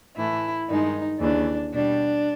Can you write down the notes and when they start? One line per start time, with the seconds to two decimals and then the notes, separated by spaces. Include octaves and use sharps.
0.16 A2 E3 A3 E4
0.68 G2 D#3 G#3 D#4
1.20 D#2 C#3 E3 D4
1.73 B2 G3 D4